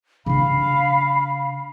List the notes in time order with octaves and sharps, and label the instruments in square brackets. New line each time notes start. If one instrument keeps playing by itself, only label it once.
[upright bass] C#3 D4 [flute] F5 [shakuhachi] B5